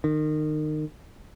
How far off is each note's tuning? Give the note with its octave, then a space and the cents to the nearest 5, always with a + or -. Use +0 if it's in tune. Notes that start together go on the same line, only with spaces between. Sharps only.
D#3 -25